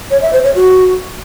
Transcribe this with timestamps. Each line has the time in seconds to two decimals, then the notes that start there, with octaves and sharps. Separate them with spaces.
0.11 C#5
0.22 E5
0.33 C5
0.44 C#5
0.55 F#4